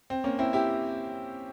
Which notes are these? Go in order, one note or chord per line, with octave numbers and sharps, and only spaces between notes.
C4
A#3 C#4
C4 E4
E4 G4